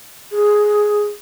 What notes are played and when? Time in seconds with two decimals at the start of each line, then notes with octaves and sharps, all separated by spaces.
0.32 G#4